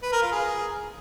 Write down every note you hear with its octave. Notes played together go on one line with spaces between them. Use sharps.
B4
A#4
F4
G#4